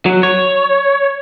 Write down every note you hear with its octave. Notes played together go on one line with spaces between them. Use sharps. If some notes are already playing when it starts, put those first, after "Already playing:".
F#3
C#5